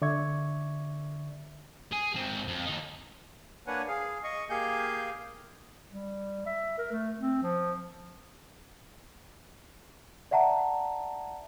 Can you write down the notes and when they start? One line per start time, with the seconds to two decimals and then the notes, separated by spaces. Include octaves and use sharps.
0.02 D3 D5 E5 C#6 G#6
1.92 G#4
2.15 G#2 C4
2.48 F2
2.66 D#2 D#4
3.67 A#3 D4 B4 C#5 F#5 G#5
3.88 G#4 F5
4.24 D#5 C#6
4.50 A#3 G4 G#4 F5 G#5 G6
5.91 G3
6.46 E5
6.78 A#4
6.92 A3
7.20 C4
7.43 F3
10.31 D5 E5 F#5 A5 A#5